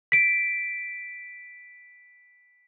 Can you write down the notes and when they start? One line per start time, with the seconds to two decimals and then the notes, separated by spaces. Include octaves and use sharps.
0.12 B6 D7